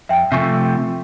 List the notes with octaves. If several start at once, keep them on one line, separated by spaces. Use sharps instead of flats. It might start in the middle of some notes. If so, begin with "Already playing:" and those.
F2 E5 G5
C3 F3 A3 E5 G#5 C#6